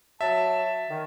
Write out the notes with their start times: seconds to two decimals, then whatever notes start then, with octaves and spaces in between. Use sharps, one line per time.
0.21 F#3 E5 A5
0.89 D#3